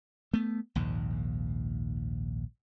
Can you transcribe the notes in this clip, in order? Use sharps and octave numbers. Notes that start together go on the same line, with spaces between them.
A3 B3
A#1 D#2 G#2